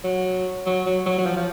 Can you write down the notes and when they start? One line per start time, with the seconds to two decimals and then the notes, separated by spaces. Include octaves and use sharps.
0.04 F#3
0.66 F#3
0.86 F#3
1.06 F#3
1.18 F#3
1.26 F3
1.37 F3